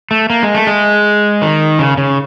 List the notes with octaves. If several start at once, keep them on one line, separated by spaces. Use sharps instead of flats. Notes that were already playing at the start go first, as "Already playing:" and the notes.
A3
A#3
G#3
A3
G#3
D#3
C#3
C#3